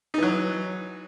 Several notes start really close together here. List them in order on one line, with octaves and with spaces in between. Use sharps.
D#4 E3 F#3